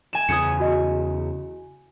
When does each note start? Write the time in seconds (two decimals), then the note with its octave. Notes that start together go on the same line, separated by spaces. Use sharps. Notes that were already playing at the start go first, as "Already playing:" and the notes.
0.13 G#5 E7
0.29 E2 C#3 D#6 G#6 C#7
0.60 F#4 D#5